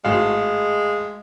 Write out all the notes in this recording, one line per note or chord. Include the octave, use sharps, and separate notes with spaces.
G#1 A2 G#3 F#4 F5